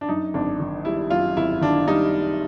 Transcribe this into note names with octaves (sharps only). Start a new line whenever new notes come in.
D4
F#2 D#4
G#1 D4
D#3
G3 E4
F#2 F4
G#1 E4
D#3 D4
G3 D#4